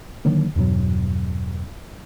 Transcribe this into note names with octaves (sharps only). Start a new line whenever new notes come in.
D3 D#3 F#3 A#3
E2 G2 B2 F#3